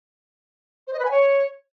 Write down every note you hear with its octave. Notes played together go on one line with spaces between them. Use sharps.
C5
D#5
B4
G#5
C#5